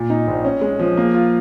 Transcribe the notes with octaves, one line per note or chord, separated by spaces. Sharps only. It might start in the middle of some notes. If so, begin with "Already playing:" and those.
Already playing: A#2
D#4
A#1
C#4
G#3
F3
A#3
F4